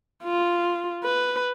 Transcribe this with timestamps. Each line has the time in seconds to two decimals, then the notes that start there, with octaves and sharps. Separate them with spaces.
0.23 F4
1.04 B4